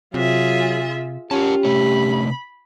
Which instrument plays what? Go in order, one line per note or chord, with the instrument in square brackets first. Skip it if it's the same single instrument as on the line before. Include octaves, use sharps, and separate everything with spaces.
[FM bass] C3 [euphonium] F#3 [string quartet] F4 G#4 E5
[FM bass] C#4 [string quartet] F4 [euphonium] G4 [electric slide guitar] A#4 F#5 A5
[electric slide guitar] C3 A3 C#5 [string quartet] B5